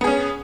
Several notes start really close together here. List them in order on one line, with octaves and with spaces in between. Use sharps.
B3 G#4 C#4